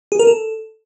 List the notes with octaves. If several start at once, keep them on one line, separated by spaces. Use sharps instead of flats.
G#4
A#4
A4